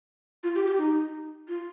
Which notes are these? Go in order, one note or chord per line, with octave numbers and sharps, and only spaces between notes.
F4
G4
G4
D#4
F4